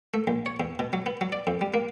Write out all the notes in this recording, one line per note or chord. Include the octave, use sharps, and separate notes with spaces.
A3
A#1
C#5
E2
B2
F#3
B3
F#3
D5
F2
G3
A#3